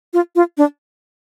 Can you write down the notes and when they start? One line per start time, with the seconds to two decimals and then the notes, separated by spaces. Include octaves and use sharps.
0.13 F4
0.36 F4
0.58 D4